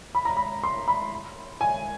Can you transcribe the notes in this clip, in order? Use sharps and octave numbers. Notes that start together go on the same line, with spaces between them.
B5
A#5
B5
C6
B5
G#5